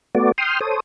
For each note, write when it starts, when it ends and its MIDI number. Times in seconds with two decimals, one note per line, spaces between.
0.15 0.32 57
0.15 0.32 59
0.15 0.32 66
0.15 0.32 74
0.38 0.59 79
0.38 0.59 84
0.38 0.59 87
0.38 0.59 89
0.61 0.80 69
0.61 0.80 72
0.61 0.80 73
0.61 0.80 87